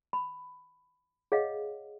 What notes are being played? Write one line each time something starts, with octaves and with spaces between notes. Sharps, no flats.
B5
G#4 C#5 D#5 F5 F#5